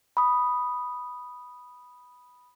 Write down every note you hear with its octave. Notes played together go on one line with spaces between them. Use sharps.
B5 D#6